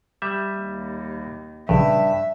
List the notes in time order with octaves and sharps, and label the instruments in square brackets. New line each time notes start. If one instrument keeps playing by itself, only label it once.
[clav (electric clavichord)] G3 E5
[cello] D#2
[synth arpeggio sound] A#1 C#3 [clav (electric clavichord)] G2 [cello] E5